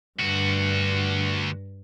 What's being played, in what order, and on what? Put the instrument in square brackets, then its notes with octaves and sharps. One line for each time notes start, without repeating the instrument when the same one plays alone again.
[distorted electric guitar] D2 F#4 [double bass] G2